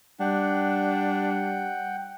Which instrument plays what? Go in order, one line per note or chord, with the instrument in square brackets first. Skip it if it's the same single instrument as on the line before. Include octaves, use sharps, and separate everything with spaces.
[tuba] G3 [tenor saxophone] D4 [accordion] F#5 G5